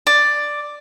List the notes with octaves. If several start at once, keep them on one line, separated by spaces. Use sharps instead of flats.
D5